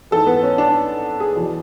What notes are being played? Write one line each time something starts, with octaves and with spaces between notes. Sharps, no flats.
G#2 E3 A4
B3
C#4
D4
G#4
E2 B2 F#3